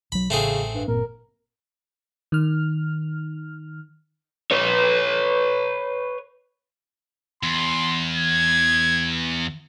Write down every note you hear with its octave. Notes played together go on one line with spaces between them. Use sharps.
B1 F#3 B5
A1 C#3 A3 C4 G#4
G2
G1 A#2 C4 A#4
D#3 F6
B4 C#5
E2 C6
G#6